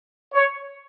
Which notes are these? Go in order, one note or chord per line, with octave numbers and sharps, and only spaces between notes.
C#5